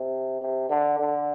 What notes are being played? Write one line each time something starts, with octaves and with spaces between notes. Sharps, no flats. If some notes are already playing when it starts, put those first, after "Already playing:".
Already playing: C3
C3
D3
D3